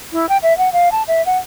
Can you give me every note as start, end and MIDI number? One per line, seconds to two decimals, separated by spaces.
0.12 0.29 64
0.29 0.37 79
0.43 0.56 76
0.58 0.72 78
0.73 0.91 77
0.92 1.03 81
1.08 1.24 76
1.26 1.37 78